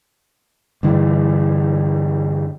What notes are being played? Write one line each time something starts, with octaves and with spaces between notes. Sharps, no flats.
G2 D3 E3